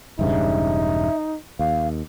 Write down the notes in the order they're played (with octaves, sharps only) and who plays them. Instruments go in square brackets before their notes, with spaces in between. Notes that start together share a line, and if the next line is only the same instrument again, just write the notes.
[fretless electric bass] E1 G2 C#3 [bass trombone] D#4 [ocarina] E5
[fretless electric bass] D#2 [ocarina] F5